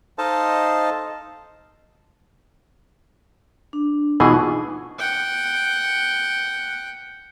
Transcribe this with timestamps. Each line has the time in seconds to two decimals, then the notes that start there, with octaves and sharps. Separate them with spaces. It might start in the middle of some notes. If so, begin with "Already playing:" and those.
0.18 D#4 A4 C5 D#5 F5 A5
3.73 D4
4.20 B2 E3 D#4 F4 G#4 C#6
4.98 F#5 G5